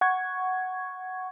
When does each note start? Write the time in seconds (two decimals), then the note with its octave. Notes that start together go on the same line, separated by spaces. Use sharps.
0.01 F#5 C#6 G#6